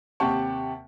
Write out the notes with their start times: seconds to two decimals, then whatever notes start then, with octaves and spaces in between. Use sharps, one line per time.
0.20 D#2 C3 G4 F#5 A5 C#6